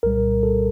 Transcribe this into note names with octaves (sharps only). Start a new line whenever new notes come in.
C2 A#2 G3 A#4
A4